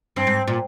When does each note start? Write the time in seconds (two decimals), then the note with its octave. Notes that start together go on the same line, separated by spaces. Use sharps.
0.16 G2 C4
0.27 G#2
0.48 A#2